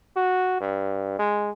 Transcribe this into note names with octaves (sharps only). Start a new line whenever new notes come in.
F#4
G2
G#3